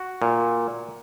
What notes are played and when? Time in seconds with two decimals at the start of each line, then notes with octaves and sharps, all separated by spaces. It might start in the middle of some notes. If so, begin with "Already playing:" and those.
Already playing: F#4
0.22 A#2